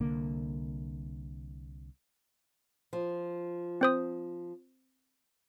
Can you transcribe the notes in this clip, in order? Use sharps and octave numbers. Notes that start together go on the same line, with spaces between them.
C2 D3 A#3
F3
C4 C5 D#6